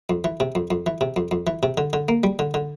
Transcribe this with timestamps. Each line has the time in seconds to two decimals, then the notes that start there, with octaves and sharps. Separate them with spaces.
0.10 F2
0.24 E3
0.40 C3
0.55 F2
0.71 F2
0.86 E3
1.01 C3
1.16 F2
1.31 F2
1.47 E3
1.63 C3
1.77 D3
1.93 D3
2.09 A#3
2.24 G3
2.39 D3
2.54 D3